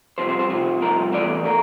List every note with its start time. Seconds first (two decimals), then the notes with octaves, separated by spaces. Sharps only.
0.18 C2 C3 F3 C5
0.29 C5
0.39 C5
0.50 C2 C3 F3
0.81 C2 C3 F3 A#4
1.13 E2 E3 A3 D5
1.45 A3 A#4